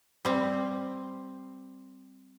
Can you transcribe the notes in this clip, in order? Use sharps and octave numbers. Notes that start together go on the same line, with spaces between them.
G3 C4